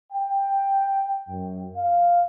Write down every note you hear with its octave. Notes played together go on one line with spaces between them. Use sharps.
G5
F#2
F5